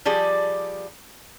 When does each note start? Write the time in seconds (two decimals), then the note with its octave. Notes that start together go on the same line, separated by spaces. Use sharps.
0.05 F3 G3 G#4 D5